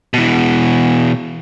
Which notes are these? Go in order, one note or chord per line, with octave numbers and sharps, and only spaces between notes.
B2 E3